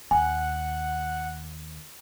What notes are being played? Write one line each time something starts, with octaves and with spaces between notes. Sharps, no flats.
D#2 F#5 G#5